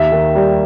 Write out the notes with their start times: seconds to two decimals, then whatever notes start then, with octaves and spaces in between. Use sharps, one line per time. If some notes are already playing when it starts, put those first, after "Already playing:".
Already playing: D#2 E5
0.12 D#3
0.35 G3